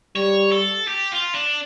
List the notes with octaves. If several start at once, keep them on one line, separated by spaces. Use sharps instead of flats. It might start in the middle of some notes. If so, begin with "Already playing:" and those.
G3 C#5
A4
G4
F4
D4